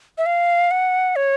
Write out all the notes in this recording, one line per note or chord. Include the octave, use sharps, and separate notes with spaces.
E5
F5
F#5
C#5